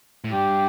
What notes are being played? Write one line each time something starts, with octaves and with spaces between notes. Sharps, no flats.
A2
G2 G4